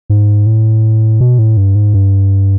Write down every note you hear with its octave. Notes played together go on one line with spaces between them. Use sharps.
G#2
A2
B2
A2
G2
G#2
G2